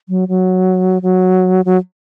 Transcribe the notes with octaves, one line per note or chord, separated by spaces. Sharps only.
F#3
F#3
F#3
F#3